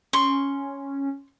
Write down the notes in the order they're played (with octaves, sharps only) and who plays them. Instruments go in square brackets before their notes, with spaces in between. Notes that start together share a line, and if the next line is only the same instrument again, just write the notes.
[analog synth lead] C#4 [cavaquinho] C6 C#6